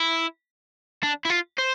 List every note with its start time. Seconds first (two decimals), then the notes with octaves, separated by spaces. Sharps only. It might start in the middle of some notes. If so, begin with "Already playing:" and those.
Already playing: E4
1.03 D4
1.25 E4
1.30 F4
1.59 C5